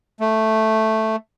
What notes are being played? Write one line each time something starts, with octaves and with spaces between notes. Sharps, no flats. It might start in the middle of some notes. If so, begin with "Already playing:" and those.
A3